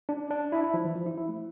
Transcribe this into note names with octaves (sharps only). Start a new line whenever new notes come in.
D4
D4
E4
E4
F3
E3
F3
E4
E4
A3